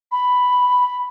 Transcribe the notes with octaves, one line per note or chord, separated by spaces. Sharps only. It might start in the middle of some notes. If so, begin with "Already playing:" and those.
B5